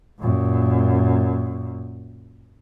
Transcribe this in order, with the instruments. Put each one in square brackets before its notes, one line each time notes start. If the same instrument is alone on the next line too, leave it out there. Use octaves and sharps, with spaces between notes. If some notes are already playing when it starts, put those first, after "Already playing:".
[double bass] F#2 A#2